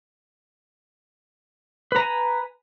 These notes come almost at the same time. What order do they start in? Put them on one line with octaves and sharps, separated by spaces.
B4 A#5 G#5